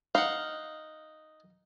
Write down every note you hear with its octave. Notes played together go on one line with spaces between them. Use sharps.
D#4 F5 F#5